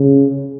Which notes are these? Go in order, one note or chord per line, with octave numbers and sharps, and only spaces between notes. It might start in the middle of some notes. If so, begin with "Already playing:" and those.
Already playing: C#3